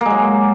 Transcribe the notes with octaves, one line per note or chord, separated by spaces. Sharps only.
F#3 G#3 A#3